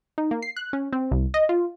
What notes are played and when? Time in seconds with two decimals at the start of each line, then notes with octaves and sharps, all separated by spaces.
0.18 D#4
0.31 A#3
0.42 C7
0.56 F#6
0.73 C#4
0.93 C4
1.11 C2
1.34 D#5
1.49 F4